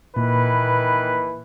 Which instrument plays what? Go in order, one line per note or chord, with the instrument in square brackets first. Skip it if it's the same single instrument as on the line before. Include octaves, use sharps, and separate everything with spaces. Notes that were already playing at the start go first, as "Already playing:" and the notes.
[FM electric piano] A#2 [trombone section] D#3 E3 B4